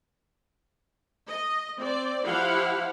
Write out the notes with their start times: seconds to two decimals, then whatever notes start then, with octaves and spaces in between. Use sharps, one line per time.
1.27 D#5
1.77 C4 D5
2.25 F3 E4 G4 F5 F#5